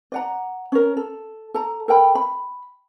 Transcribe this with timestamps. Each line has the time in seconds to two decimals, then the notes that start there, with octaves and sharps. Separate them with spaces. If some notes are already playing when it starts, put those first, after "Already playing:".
0.12 D5 F#5 A#5
0.72 C#4 A#4
0.97 A4
1.54 A4 A#5
1.88 A4 A#4 G5 B5
2.15 B5